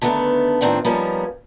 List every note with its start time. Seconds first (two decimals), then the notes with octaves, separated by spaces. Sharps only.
0.02 D3 D#3 A3 B3
0.61 A2 D#3 C4 D4 F4
0.85 F3 G3 A#3 B3 C#4 D#4